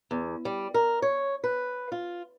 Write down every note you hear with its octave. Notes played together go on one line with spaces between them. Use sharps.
E2
G3
A#4
C#5
B4
F4